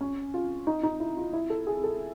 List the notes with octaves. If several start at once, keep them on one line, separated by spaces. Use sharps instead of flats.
C#4
F4
D#4
D#4
E4
F4
E4
A4
G#4
A4